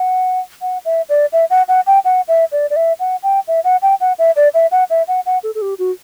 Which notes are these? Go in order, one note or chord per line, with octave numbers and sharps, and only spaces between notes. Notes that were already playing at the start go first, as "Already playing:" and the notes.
Already playing: F#5
F#5
E5
D5
E5
F#5
F#5
G5
F#5
E5
D5
D5
E5
F#5
G5
E5
F#5
G5
F#5
E5
D5
E5
F#5
E5
F#5
F#5
A4
A4
G4
F#4